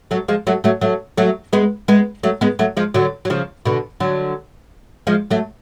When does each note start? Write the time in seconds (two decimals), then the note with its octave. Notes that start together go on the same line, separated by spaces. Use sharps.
0.11 F#3 A3
0.28 F3 G#3
0.47 F#3 A3
0.64 F#3 A3
0.81 F#3 A3
1.17 F#3 A3
1.53 G#3 B3
1.88 G#3 B3
2.23 F#3 A3
2.41 G#3 B3
2.59 F#3 A3
2.77 F3 G#3
2.94 D3 F#3
3.25 F#3
3.30 C#3 F3
3.65 B2 D3
4.00 D3 F#3
5.07 F3 G#3
5.31 F#3 A3